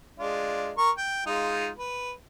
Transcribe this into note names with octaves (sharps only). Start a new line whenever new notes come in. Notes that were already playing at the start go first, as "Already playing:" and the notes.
G#3 D4 F4
A#4 C#6
G5
G#3 D#4 F4
B4